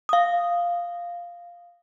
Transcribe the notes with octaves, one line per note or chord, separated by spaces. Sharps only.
F5 D#6